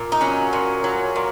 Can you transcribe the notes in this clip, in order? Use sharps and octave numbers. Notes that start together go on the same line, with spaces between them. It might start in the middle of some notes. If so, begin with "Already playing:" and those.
Already playing: A#2
D#4
F#3 C#4
A#2
F#3
A#2